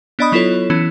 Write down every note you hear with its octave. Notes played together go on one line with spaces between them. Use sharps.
B3 D4 D5 D#5 B5 D#6
F#3 B3 E4 F4 A4 C#5
E3 B3 C#4 E4